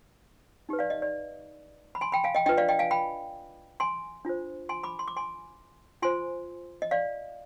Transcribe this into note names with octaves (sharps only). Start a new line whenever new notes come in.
D#4 G4 B4
D5 F5
D#5
D5
B5
G#5 C6
G5 B5
F5 G#5
D#5 G5
D4 F4 B4 D#5 G5
D5 F5
D#5 G5
F5 G#5
G5 B5
G#5 C6
D4 F4 C5
G#5 C6
B5 D6
C6
D6
G#5 C6
F4 C5 G#5 C6
D#5
D5 F5